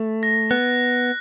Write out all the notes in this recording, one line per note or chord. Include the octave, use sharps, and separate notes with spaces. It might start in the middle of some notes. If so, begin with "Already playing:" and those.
Already playing: A3
A#6
B3 F#6